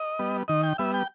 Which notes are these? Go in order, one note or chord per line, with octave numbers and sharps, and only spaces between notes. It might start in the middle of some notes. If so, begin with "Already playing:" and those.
Already playing: D#5
G3 B3
D#3 D#5
G5
G3 B3 E5
G5